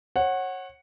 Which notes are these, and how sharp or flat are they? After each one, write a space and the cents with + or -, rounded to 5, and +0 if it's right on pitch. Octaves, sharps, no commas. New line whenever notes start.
C#5 -30 F#5 +0